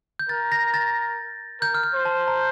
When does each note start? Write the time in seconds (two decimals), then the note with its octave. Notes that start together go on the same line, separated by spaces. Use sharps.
0.19 G6
0.29 A#4 A6
0.52 A#6
0.74 A6
1.61 A#4 G6
1.74 F6
1.83 G6
1.94 C5
2.05 A5
2.28 A#5